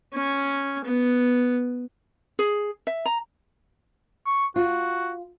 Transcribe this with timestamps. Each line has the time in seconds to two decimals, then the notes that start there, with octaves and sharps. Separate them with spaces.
0.13 C#4
0.84 B3
2.39 G#4
2.87 E5
3.06 A#5
4.26 C#6
4.56 F4 F#4